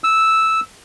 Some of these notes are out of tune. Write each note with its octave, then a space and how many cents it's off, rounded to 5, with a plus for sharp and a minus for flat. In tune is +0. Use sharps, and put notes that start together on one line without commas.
E6 -5